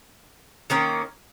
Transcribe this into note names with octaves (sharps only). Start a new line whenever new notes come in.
D#3 A#3 C#4